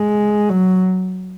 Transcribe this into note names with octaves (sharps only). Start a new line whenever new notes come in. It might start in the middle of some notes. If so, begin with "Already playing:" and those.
Already playing: G#3
F#3